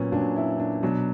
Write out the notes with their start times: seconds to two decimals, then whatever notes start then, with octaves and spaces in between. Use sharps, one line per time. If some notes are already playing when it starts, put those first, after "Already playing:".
Already playing: A#2 F#3 B3 C#4
0.12 A#2 D4
0.17 F#3
0.36 E4
0.60 D4
0.83 B2 F#3 D4